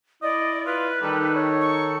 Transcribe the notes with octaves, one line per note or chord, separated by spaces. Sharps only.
E4 D5 D#5
F4 B4
D#3 G3 D#4 A4
C#5
C#6